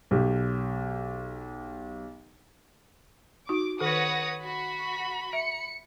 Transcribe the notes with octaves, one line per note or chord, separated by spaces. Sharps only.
B1 G4
D#4 F#4 D6
D#3 A4 B4 C#5 F#5 D#6 A#6
F#4 B5
E5 C#7